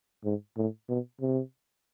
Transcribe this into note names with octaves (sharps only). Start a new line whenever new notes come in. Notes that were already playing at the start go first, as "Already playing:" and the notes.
G#2
A2
B2
C3